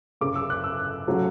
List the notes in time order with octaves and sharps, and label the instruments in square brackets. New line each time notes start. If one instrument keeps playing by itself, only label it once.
[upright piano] F#1 F#2 C#3 D6
E6
F#6
E6
C#3 F#3 A3